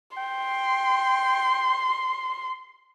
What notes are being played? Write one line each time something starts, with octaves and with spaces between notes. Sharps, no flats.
G5 C6